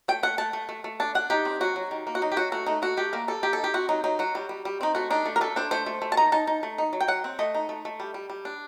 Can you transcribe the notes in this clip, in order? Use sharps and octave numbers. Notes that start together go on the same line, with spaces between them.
A3 G5
A3 F#5
A3 A5
A3
A3
A3
D4 A5
D4 F#5
D#4 G4
C4
F#3 F#4
F#3
D#3
A#3
F#4
F#3 D#4
G4
F#3 F#4
A3 F#4
A3 D#4
A3 F#4
A3 G4
A#3 A#4
G3 A4
A#3 G4
A4
D#4
G4
C4 F#4
F#3 D#4
F#3 D#4
F#3 F#4
G3
G3
G3
C4 D#4
A3 F#4
D4 D#4
A3
A#4
A3 A4
D4 C5
A3 C5
A3
A3
A5
D#4 A#5
D#4 A5
D#4
A3
D#4
F#3
G5
F#3 F#5
C4
A3 D#5
D#4
A3
A3
G3
G3
G3
D4